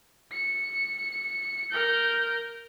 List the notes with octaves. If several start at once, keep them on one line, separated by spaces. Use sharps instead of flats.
C#7
A#4 G6